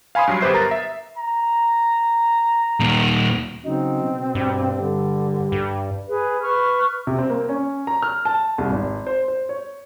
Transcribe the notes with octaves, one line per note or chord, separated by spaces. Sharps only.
F5 G#5 B5 C6 D#6
G2 F#3 C7
G1 G4 B4 C5 E5 C7
A#4 A#5 A6
E5
A#5
D#2 A#2
C#3 F#3 C4 D#4
B2
G2
D3 G3
G2
G#4 B4
B4 C#6 F6
C3
C4
A#3
C#4
A#5
F6
A5
C2
G#1
C5
C5
C#5